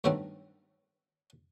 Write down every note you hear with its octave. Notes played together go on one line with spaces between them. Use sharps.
G2 D#3 F#3 A3 B3 C4